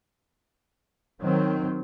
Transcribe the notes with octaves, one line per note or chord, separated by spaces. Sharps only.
D#3 F#3 C4